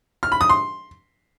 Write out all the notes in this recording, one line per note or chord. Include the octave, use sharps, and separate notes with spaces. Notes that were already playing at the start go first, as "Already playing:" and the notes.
F6
B5
D#6
C6